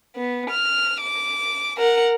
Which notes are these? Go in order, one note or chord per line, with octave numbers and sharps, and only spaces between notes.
B3
F6
D6
A#4 F#5